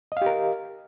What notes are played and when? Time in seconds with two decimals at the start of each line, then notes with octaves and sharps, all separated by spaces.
0.12 D#5
0.17 F5
0.22 G4
0.26 A#4